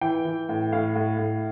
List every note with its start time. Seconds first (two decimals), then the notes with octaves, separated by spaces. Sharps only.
0.01 E3 G5
0.25 E3
0.49 A2
0.72 A2 F5
0.96 A2
1.19 A2